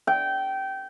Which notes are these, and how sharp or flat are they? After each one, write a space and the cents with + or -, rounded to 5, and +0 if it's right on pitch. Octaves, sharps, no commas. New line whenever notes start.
G5 -20